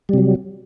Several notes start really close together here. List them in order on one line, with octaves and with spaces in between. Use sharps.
G3 C3 F#3